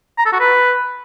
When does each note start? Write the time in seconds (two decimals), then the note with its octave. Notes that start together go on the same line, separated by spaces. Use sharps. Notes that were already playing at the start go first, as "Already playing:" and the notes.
0.18 A#5
0.25 A4
0.33 F#4
0.40 B4